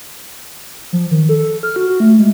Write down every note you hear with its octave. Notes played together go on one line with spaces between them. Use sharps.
F3
D#3
A4
A4
F6
F#4
F#4
A3
G#3